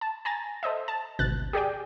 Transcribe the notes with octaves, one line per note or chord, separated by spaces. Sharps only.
A5
G#5 A#5 A6
A4 C5 D#5 E5
A5
G#1 D2 B2 F#6 A6
G4 G#4 D5 G5